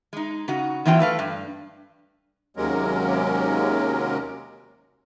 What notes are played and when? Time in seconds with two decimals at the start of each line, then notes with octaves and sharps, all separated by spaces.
0.13 G#3 D#4
0.48 C#3 D#4 F#4
0.85 E2 E3 F#3 F4 G5
1.00 A3 B4 F5
1.19 G2
2.57 D#2 C3 F#3 G#3 C#4 A#4